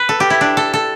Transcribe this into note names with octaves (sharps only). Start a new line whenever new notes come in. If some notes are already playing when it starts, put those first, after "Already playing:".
Already playing: B4
A4
G4
E4
D4
A4
A4